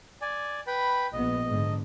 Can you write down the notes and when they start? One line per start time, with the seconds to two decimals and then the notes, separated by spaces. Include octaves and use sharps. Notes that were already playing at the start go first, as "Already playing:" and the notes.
0.22 D5 G#5
0.67 B4 G5 B5
1.13 A#1 B3 D#5
1.48 G#2 D3